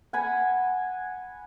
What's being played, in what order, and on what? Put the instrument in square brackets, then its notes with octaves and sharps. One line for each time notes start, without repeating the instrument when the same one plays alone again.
[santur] F#5 G#5 B5